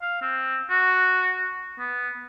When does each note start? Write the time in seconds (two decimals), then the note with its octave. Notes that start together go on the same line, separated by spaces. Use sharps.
0.02 F5
0.22 C4
0.70 F#4
1.79 B3